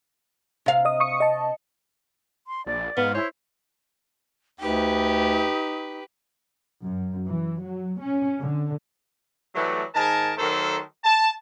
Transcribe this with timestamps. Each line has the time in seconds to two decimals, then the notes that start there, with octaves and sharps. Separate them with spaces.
0.66 C3 F5
0.85 D#5 D#6
1.00 C#6 D#6 C#7
1.20 D#5 A5
2.47 C6
2.66 A#1 D5
2.97 G#2 B3 F5
3.14 E4 C5 C#5
4.60 D2 D#4 G4 B4
6.85 F#2
7.28 E3
7.63 F#3
8.01 C#4
8.40 D3
9.55 E3 F#3 G3 A3
9.95 G#2 D#3 A#4 G#5 A5
10.38 D#3 F#3 A3 A4 A#4 C5
11.04 A5